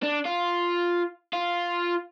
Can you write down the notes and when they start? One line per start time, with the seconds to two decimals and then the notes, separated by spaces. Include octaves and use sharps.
0.03 D4
0.26 F4
1.33 F4